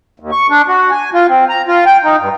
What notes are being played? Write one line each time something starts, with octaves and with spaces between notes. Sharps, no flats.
D#2
C#6
D4
F#4
G#5
F4
C4
A#5
F4
G5
D#4
G2